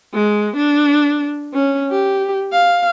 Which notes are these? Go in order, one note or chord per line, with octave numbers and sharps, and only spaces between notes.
G#3
D4
C#4
G4
F5